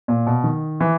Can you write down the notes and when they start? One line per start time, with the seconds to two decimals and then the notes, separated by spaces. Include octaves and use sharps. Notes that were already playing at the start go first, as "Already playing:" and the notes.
0.08 A#2
0.27 B2
0.44 D#3
0.81 E3